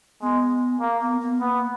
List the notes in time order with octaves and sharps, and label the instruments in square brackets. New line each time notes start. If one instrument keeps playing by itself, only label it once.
[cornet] G#3 [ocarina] B3
[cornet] A#3
[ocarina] B3
B3
[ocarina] A#3 [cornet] B3